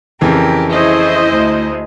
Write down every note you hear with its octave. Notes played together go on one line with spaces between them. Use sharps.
F2 C#3 E3 G4 A#4
A3 E4 G#4 C5 D#5
D2 G#3